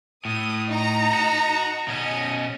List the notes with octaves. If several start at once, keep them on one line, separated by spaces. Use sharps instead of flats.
A2 D#6
D#4 A#5
F#4
B2 C#4 D#5